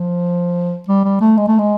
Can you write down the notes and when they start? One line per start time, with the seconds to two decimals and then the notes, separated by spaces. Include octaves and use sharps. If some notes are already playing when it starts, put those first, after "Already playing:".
Already playing: F3
0.88 G3
1.04 G3
1.21 A3
1.37 G#3
1.48 A3
1.59 G#3